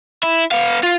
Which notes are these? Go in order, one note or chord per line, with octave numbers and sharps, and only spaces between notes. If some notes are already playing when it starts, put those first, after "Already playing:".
E4
B3 F5
F4